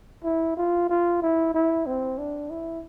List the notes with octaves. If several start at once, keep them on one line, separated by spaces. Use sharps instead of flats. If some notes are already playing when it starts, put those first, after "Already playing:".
E4
F4
F4
E4
E4
C4
D4
E4